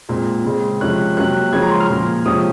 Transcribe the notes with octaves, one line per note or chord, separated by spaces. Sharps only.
A#2 G#3 C4
C#3 G#3 C4
C3 F3 G#3 C#4 F#6
C3 F#3 A#3 C#4 F#6
C#3 F3 G#3 C#4 G#6
A#5
C6
F6
A#2 F3 A#3
C3 F3 G#3 C#4 D#6